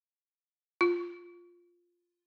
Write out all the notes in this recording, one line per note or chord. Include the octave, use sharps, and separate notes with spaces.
F4